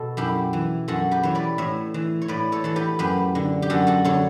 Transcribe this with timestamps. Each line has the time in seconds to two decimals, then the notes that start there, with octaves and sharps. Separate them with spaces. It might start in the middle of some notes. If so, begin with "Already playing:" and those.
Already playing: B2 A4
0.17 F#2 E4 G4
0.53 E3
0.88 F#2 F#4 A4
1.11 G4 B4
1.23 E3 C#5
1.35 B4 D5
1.58 A2 C#5 E5
1.94 E3
2.22 C#5
2.28 A2 B4 D5
2.52 A4 C#5
2.64 E3 A4
2.76 G4 B4
2.99 F#2 G4 B4
3.35 D3
3.62 G4
3.70 F#2 F#4 A4
3.87 F#4 A4
4.05 D3 A4 C#5